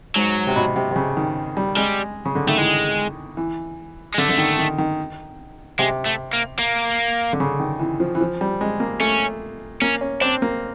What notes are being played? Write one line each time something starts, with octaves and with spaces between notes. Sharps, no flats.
G#2 F#3
C3
B2
C3
C3
C#3
D#3
G3
G3 G#3
C#3
D3
D#3 A3
E3 G#3
E3
G#3
D3 A3
D3
D#3
D#3
D#3
C3 G#3
A3
A#3
A#3
D3
C#3
D#3
E3
F3
E3
F3
G3
G#3
A#3
A3 C#4
A#3 C#4
C#4
C4 D4
A#3